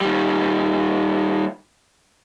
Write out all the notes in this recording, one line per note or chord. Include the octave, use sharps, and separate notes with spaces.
D#3 G3